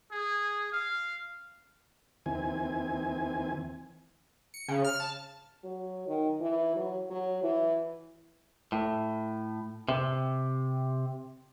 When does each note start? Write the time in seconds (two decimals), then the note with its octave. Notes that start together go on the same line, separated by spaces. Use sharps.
0.11 G#4
0.72 F5
2.26 D#2 E3 C4 G#5
4.54 C#7
4.68 C#3
4.85 F6
5.00 A5
5.64 F#3
6.08 D#3
6.41 E3
6.76 F#3
7.10 F#3
7.43 E3
8.72 A2
9.88 C3